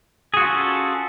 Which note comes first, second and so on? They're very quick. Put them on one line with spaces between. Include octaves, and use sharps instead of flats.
G#4 F#4 F4 C#4 A4